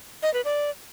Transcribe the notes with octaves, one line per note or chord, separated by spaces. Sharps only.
D#5
B4
D5